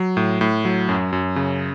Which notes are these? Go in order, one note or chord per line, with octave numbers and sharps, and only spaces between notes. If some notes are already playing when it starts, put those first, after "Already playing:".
Already playing: F#3
A2
A2
F#3
F#2
F#2
C#3